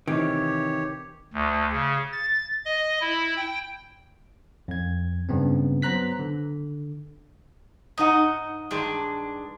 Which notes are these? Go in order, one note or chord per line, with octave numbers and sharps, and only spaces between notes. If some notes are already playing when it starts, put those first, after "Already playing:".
C3 D#3 E3 G4 C#5
D2
C#3
A6
D#5
E4
G5
F2 G#6
G2 C#3 B3 C4
F#3 B3 C5 A#5 F#6 B6
D3
G#2 D#4 D#5 F#5
G2 D#3 G#3 D4